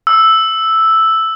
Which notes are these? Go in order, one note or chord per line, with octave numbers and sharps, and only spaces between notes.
E6